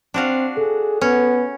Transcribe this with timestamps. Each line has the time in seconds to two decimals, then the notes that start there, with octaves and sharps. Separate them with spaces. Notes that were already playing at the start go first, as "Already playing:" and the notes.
0.14 C4 D4 F#4 F5
0.57 G#4 A4
1.01 B3 C#4